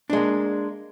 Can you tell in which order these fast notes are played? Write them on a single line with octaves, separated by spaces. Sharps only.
D4 G#3 A#3